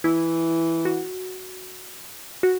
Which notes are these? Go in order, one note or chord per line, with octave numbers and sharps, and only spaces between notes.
E3 E4
F#4
F#4